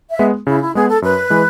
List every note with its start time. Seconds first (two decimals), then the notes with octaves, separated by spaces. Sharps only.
0.10 E5
0.19 G#3 B3
0.47 C#3 E4
0.61 E4
0.75 G#3 B3 G#4
0.88 A4
1.02 F#2 B4
1.30 E3 G#3